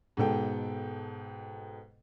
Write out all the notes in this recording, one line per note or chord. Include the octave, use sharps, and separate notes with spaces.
G#2 B2 A4 G5